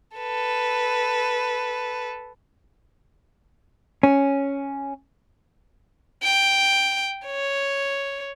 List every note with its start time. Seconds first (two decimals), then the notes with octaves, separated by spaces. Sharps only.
0.17 A4 B4
4.03 C#4
6.23 G5
7.26 C#5